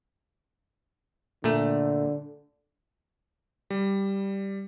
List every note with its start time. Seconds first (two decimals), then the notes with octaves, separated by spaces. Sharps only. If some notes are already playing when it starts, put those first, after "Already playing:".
1.44 A#2 D3 A3
3.70 G3